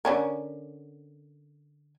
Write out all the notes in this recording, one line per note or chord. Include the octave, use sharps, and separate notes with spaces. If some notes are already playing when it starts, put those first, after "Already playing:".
D3 C#4 A#4